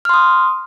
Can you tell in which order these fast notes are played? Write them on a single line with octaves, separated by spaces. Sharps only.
F6 C6 D#6